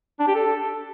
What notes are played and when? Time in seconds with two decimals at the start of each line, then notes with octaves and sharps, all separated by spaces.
0.20 D4
0.27 G4
0.35 A4